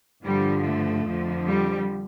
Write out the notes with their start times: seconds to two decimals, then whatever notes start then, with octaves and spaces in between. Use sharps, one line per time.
0.24 G2 D3 F3 G3
0.64 A3
1.06 F2 D3 F3
1.47 G3